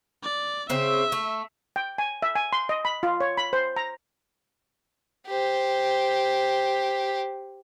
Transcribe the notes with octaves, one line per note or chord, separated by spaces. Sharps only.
D5
C#3 C4 E5
A3
G5
G#5
E5
G#5
C6
D#5
B5
F4
C#5
B5
C5
A#5
G4 C5